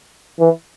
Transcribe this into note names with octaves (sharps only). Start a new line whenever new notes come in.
E3